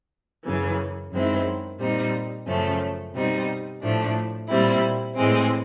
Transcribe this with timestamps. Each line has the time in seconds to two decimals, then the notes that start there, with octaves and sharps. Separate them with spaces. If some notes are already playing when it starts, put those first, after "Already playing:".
0.44 F#2 C#3 E3
1.12 F#2 D#3 G#3 C4 E4
1.79 A#2 G3 C4 D#4
2.47 F#2 C#3 F3 A3 C#4
3.14 B2 G3 C4 D#4
3.82 A2 F3 A3 D4
4.49 A#2 G3 C4 E4
5.16 A2 E3 G#3 C4